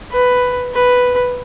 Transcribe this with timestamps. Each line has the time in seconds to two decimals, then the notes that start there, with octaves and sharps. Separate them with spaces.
0.12 B4
0.74 B4